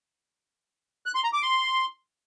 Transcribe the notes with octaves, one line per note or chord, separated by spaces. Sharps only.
F#6
C6
A#5
D6
C6